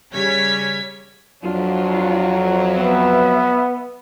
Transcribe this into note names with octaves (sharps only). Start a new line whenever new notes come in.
C#3 G3 C#4 C#5 G#6 B6
F2 F#3 D4 F4
B3 B4 E5